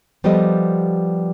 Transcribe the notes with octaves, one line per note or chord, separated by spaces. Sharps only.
F3 G3 B3 G4 A4 D#5